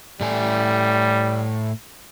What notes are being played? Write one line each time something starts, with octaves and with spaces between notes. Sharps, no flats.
A2 G3 A3 G#5